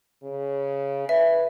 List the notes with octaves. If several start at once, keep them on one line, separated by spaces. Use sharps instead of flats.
C#3
B4 E5